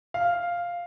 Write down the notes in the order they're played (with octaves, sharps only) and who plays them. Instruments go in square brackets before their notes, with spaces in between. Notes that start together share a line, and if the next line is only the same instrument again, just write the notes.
[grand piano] F5